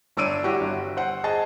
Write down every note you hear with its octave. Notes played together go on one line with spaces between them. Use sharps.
G1 D4 C#5 E6 D7 D#7
E4 F#4 G4
G1
C5 F#5
G#4 D#5 A5